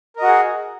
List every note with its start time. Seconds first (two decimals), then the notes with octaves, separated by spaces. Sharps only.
0.16 A#4
0.19 D#5
0.22 F#4
0.24 F#5
0.27 G#4